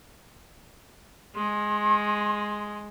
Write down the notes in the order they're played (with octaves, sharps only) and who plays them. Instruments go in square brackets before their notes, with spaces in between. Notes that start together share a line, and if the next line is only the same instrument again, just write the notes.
[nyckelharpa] G#3 [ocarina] C6